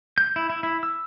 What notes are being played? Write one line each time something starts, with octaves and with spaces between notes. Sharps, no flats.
G6
E4
E4
E4
E6